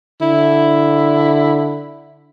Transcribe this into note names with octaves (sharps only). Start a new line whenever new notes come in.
D3 E4